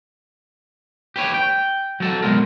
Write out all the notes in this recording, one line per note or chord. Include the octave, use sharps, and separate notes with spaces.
G4 B4 C#5
G5
F#3 A4
B2 F#3 G#3 A#4